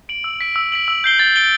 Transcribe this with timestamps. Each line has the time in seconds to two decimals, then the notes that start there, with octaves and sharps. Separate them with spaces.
0.09 D7 F#7
0.24 E6
0.41 B6 D7
0.56 E6
0.72 B6 D7 F#7
0.88 E6
1.04 G6 C7 G7
1.19 A6
1.36 D7 G7